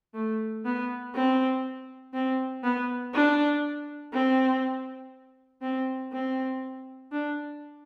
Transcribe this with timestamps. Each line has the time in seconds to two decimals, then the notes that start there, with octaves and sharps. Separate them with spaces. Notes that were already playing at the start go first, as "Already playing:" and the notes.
0.14 A3
0.65 B3
1.14 C4
2.14 C4
2.64 B3
3.14 D4
4.13 C4
5.62 C4
6.12 C4
7.12 D4